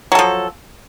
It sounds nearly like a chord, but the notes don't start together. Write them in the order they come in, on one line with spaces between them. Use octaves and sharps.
F#3 A4 F3